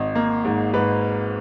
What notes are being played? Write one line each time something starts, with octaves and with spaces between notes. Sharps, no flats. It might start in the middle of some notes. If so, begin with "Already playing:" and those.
Already playing: G#1 D#5
A#3
G#2
G#2 B4